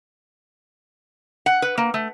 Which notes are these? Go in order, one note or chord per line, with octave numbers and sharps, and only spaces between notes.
F#5
B4
A#3
A3